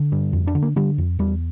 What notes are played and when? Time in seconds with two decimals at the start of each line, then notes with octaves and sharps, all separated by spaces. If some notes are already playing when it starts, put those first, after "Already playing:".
Already playing: D3
0.12 G2
0.33 F2
0.47 D4
0.55 D3
0.63 A#3
0.76 D3 G3
0.98 F2
1.19 E2 G3